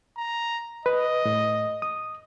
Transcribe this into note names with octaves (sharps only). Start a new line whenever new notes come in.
A#5
B4 D#5
A2
D#6